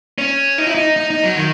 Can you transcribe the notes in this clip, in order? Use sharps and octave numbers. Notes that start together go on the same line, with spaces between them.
C#4
D#4
E4
D#4
D#4
D#4
F#3
D#3